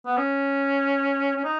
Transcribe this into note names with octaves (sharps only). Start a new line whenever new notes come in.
B3
C#4
C#4
D#4